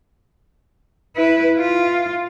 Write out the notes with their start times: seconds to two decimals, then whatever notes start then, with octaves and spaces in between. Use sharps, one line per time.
1.16 E4 B4
1.59 F4